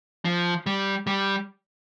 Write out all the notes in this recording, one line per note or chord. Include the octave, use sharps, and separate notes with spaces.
F3
G3
G3